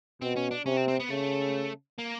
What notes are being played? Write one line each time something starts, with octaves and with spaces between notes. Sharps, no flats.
B2 C4
C#4
D4
C3 C#4
C4
C4
B3
C#3 A3
A#3